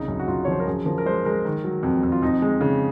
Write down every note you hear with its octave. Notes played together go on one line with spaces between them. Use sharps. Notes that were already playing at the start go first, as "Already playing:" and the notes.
Already playing: C2 C#3 D#4
F#2
F#4
F#2 F4
C#5
F3 C5
A#4
F#2 G#4
F3 A#4
A#4
G#3 C5
G#3 A#4
D#3
F#3
F2
F2
F4
F2 D#4
G#3
C#3